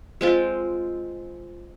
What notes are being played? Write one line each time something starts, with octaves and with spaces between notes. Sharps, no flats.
G#3 C4 F4